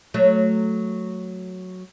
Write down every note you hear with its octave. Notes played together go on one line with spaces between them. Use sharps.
F#3 A3